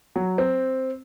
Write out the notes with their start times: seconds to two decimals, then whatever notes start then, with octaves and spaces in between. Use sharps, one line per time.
0.16 F#3
0.38 C4